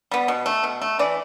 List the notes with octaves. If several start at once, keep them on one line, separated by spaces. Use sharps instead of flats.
G3 B3
B2
A3
B2
A3
E3 D5